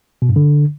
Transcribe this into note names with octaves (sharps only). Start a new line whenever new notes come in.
B2
G2
D3